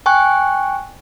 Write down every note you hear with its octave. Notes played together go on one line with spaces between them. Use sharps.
G5 G#5 C#6 F#6